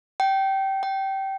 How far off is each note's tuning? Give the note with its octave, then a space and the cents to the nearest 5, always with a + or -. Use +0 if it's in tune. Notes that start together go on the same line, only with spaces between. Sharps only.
G5 -20
G5 -20